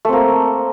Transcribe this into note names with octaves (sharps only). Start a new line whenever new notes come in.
A3 A#3 C4